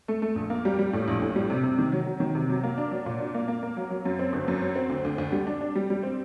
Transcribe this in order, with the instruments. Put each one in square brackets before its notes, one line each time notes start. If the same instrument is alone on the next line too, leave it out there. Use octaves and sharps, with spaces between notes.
[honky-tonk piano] A3
A3
A#1
A#3
G3
G3
A2
A#1
A2
G3
C3
C3
D#3
F#3
F#3
D#3
C3
F#3
A#3
D4
F#3
A#2
D4
A#3
A#3
A#3
F#3
F#3
F#2
C4
G1
F#2
F#3
C4
D2
D2
D2
G3
D4
D4
G3
G3
C4